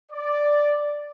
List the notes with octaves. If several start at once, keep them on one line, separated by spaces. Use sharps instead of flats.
D5